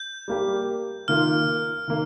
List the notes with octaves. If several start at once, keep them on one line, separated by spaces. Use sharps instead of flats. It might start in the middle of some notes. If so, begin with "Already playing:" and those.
Already playing: G6
G3 A#3 G4
D#3 A#3 F4 F6
D#3 A#3